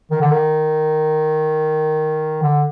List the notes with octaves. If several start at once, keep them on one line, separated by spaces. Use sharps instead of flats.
D#3
D3
D#3
D3